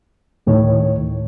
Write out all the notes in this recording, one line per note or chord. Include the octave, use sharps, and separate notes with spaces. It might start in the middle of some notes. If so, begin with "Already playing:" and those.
D2 A2 D#3 C#5